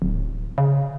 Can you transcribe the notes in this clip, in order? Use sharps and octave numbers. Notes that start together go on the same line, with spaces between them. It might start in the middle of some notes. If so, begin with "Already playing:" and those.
D1
C#3